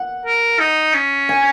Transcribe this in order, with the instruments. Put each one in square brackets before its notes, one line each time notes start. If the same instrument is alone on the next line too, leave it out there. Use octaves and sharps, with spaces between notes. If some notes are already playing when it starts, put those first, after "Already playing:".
Already playing: [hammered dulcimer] F#5
[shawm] A#4
D#4
C#4
[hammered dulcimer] G#5